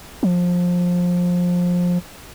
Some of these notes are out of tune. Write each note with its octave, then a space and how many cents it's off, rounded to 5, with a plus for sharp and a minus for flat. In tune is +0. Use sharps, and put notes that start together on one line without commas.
F3 +20